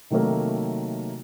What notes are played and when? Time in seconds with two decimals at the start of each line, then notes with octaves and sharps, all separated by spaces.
0.10 C3 D#3 F#3 A3 A#3